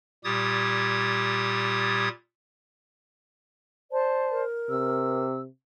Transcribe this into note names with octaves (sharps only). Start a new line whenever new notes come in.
A#2 G3 G4 D#6 G#6 A6
C5 D5 A5
A#4
C3 E6